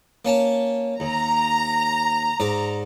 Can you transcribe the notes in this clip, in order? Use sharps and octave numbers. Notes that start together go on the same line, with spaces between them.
A#3 C#4 A5
D#2 A#5
G#2 D5